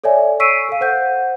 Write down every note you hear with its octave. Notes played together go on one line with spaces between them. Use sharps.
A4 C#5 D5 E5 G#5
C#6 E6 B6 C7 D7 D#7
A4 F5
C5 F#5 G6